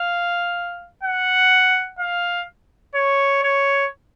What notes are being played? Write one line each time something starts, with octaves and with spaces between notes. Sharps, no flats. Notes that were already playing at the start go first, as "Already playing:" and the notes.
Already playing: F5
F#5
F5
C#5
C#5